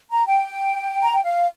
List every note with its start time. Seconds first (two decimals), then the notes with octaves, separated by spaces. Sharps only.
0.12 A#5
0.26 G5
1.02 A#5
1.13 G5
1.24 F5